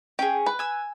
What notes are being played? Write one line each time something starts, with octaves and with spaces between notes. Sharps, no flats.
C#4 G#4 G5
B4
G#5 E6